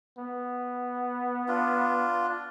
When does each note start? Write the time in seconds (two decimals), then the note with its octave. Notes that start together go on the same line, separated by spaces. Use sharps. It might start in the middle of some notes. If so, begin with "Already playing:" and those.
0.18 B3
1.48 D4 F4